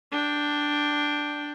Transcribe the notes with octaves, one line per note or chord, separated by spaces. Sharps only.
D4 G5